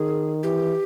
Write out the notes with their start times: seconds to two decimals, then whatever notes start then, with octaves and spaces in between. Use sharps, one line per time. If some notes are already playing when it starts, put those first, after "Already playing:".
Already playing: D#3 G#4
0.43 E3 G4